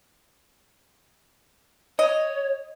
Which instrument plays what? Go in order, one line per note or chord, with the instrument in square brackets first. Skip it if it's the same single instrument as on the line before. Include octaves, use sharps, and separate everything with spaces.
[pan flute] C#5 [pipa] D#5